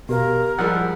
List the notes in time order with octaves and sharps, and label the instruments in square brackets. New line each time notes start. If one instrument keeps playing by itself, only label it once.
[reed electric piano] B2 [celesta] G4 F5 [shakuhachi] A#4
[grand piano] F3 G3 G#3 [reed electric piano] F#5 [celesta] E6